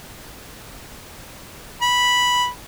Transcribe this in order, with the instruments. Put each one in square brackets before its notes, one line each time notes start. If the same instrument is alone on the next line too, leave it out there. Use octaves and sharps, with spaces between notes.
[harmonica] B5